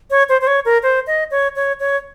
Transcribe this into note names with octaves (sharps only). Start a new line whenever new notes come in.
C#5
C5
C5
C#5
A#4
C5
D#5
C#5
C#5
C#5